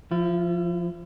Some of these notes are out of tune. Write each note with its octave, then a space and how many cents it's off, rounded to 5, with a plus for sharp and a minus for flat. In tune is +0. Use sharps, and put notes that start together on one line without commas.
F3 +0 E4 +40